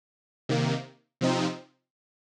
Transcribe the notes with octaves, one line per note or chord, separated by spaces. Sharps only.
C3 D#3 A#3
C3 F3 C4 D#4